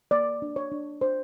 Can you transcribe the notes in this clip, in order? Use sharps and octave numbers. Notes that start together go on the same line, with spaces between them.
A#3 D5
D4
C#5
D4
D4 C5